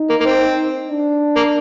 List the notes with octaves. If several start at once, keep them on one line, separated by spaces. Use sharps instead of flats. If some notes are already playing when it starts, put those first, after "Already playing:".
Already playing: D#4
A#3
A#3
C4
D4
A#3